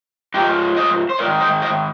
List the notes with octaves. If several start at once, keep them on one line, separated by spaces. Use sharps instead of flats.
G#2 F3 D#4 G4
C5 D#5
C5
G#2 D#3 A#4 D5
C5 D#5
C5 D#5